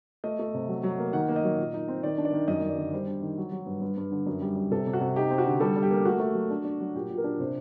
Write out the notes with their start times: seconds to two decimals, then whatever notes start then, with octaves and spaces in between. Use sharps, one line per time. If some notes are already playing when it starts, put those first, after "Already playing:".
0.24 A3 D#5
0.39 A3
0.54 C3
0.68 F#3
0.83 F#3
0.99 A#3
1.13 D#3 F#5
1.28 A#3
1.36 D#5
1.44 F#3
1.58 A#2
1.74 D#4
1.88 C4
2.03 D#3 D5
2.18 D4
2.25 D5
2.33 D#3
2.48 F#2 D#5
2.62 F#2
2.70 D5
2.77 D3
2.93 G3 C5
3.07 D4
3.22 D#3
3.37 F#3
3.52 F#3
3.66 G2
3.81 G2
3.97 G2
4.12 D3
4.26 F#2
4.41 G3
4.56 G3
4.71 C3 A4
4.87 C3
4.93 F#4
5.01 C3
5.16 D#4 G4
5.30 C4
5.38 F#4
5.46 D3
5.60 G3 A4
5.76 G3
5.82 G4
5.90 A#3
6.05 A3 F#4
6.20 A3
6.35 F#3
6.50 D4
6.64 D4
6.80 F#3
6.95 A#2 G4
7.10 A#2
7.18 A#4
7.24 D4
7.40 C3 C5